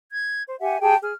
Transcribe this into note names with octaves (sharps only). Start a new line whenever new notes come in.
G#6
C5
G4 E5 F#5 G#5
G4 G#4 G5 A5
G#4 F6